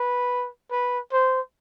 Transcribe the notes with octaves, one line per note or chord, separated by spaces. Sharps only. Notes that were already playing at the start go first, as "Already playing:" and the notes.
Already playing: B4
B4
C5